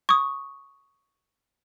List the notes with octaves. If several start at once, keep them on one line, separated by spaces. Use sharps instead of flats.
C#6 D#6